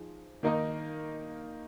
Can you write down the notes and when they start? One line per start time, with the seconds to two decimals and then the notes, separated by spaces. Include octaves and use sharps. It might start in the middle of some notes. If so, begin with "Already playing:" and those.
Already playing: F3 D#4 G#4
0.43 D#3 A#3 D#4 A#4 D#5